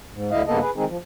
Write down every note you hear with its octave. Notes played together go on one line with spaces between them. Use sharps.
G#2
D2 D3 E4 D#5 F5
G2 C#3 A#3 B3 A4 D#5
G#4 B4
D#3 G#3 C4 D#4 G#4
F3